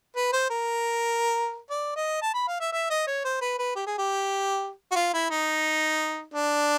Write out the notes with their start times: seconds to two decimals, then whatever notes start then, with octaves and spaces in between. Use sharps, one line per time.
0.16 B4
0.33 C5
0.50 A#4
1.70 D5
1.96 D#5
2.22 A5
2.34 B5
2.48 F5
2.61 E5
2.72 E5
2.90 D#5
3.07 C#5
3.25 C5
3.41 B4
3.59 B4
3.76 G4
3.87 G#4
3.98 G4
4.92 F#4
4.96 F4
5.14 E4
5.30 D#4
6.34 D4